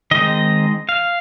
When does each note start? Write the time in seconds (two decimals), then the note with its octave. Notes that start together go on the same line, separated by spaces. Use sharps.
0.11 D#3 G#3 C4 D#5
0.89 F5